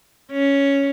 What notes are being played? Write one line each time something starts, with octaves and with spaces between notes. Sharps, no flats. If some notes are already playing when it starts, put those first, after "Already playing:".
C#4